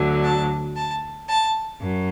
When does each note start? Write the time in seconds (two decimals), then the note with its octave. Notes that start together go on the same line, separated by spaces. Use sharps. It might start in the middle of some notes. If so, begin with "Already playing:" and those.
Already playing: D2 D3 F#3
0.23 A5
0.76 A5
1.28 A5
1.81 F#2